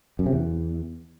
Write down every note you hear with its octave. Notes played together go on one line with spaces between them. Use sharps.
F#2
C3
E2